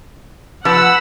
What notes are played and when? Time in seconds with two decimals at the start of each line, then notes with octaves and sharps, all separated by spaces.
0.65 F3 B4 F#5 B5 E6